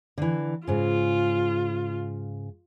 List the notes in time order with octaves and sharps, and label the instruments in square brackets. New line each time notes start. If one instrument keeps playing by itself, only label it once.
[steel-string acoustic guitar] D3 E3
[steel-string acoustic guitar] G#2 C#3 [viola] F4